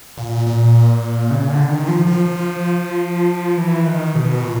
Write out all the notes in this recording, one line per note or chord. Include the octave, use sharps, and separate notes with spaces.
A#2
A#2
C#3
D3
D#3
F3
F3
F3
E3
D#3
B2
A#2